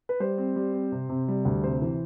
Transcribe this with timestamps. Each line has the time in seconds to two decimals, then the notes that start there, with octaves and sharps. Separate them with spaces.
0.09 B4
0.20 G3 C5
0.38 C4
0.56 G3
0.74 C4
0.92 C3
1.09 C3
1.28 G3
1.45 D2
1.64 C3 C5
1.82 E3